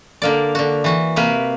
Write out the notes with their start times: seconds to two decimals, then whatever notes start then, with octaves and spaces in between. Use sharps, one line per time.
0.22 D3 A#3 D5
0.55 D3 F#4
0.84 E3 F#4
1.16 C3 A#3 B4